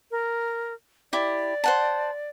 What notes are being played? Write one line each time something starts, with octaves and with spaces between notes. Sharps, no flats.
A#4
E4 G4 D5
C5 F#5 A5